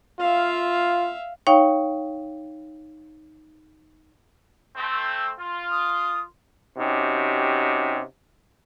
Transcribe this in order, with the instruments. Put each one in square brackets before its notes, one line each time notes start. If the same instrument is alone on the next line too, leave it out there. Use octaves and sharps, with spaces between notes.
[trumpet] F4 [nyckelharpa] E5 F5
[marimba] D#4 C#5 F5 G5 C#6
[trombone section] A3 C4
F4
[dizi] D#6
[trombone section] C3 C#4 D#4 F#4 G4